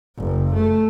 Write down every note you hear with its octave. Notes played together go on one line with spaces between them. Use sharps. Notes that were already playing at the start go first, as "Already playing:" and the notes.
F#1
A3